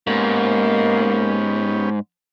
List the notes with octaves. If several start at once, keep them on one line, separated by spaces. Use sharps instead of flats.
G#2 A#3 B3 C#4 G4